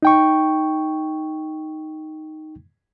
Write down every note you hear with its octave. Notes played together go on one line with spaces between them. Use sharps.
D#4 G5 C#6